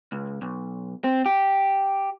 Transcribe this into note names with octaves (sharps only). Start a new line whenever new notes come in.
C#2
B1
C4
G4